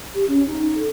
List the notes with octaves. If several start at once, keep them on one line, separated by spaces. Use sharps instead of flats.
G4
C#4
D#4
A4